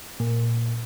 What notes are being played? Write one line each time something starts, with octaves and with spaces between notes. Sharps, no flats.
A#2